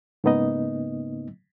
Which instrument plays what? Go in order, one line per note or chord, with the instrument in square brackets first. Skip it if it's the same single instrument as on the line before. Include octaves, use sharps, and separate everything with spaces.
[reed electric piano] G#2 C#3 A#3 B3 D#4 D#5